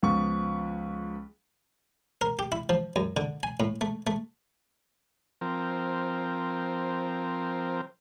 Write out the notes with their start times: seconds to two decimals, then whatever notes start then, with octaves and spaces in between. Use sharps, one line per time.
0.03 C#2 F3 B3 C#6
2.21 A#4
2.39 G4
2.52 E4
2.69 F3
2.96 F#2
3.17 D3
3.43 G#5
3.60 A2
3.81 A3
4.07 A3
5.41 F3 C4 A#4